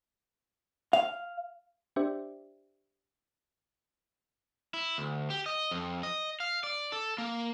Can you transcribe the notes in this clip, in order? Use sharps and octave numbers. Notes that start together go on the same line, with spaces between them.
F5
D4 G4 C5 D5 E5 G5
E4
D2
G4
D#5
F2
D#5
F5
D5
A4
A#3